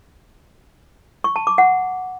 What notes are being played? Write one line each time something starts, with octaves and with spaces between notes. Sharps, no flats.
C#6
A5
D6
F#5